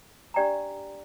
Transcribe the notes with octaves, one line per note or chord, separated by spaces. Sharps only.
D4 G4 D5 G5 A#5